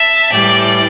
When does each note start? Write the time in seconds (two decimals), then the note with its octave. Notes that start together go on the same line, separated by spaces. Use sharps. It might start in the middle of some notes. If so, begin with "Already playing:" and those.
Already playing: E5 A5
0.31 A2 E3 G3 D5 G5